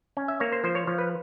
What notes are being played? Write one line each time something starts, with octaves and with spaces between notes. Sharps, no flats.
C#4
E5
A#3 C#5
C5
F3 C5
C#5
F3 C#5
B4